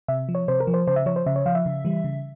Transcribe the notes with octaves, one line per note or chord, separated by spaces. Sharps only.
C3 E5
F3
C#5
C3 C5
A#4
F3
C5
C#3 C5
E5
F3 C#5
C5
C#3 E5
C#5
F3 F5
E5
C#3
E3 G3
C#3